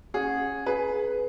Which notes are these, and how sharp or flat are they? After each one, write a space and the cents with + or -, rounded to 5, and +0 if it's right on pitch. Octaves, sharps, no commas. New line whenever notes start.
C#4 -10 G#4 -5 F#5 -30
G#4 +20 B4 +0